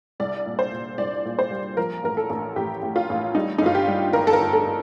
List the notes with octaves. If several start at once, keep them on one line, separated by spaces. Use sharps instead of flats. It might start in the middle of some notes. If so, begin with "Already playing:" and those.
C2 D5
A#2
C5
A#2
C2 D5
A#2
C5
G3
F3 A#4
A1 A#4
A4
A1
A1 G4
A1
F4
A1
G3 D#4
D#4
G1 F4
G4
G3
G1 A#4
A4
A#4
G1
A4